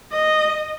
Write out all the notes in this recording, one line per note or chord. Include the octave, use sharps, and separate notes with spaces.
D#5